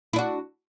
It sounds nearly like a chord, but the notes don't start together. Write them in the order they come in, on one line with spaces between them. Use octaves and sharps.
E4 D4 F#4